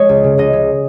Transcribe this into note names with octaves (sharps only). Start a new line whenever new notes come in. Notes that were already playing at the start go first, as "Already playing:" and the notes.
Already playing: G#3 C#5 D#5
C#2
C#3
C#2 D#5
G#3